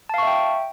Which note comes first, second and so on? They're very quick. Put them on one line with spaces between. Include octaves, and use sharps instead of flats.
A5 F5 C#6 E5 G5